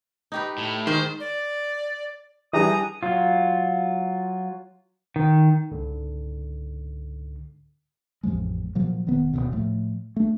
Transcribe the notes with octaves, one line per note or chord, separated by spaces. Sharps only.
D#4 G4 B4
A2
G#2 D#3 C5
D5
E3 G3 D4 G#4 A#5 D#6
F#3 F4
D#3
C#2 G#2 D3
A1 F2 F3 G#3
A#2 F3 F#3
E1 D#3 B3
D#1 G#1 D2 B2
A2 F3
A3 D4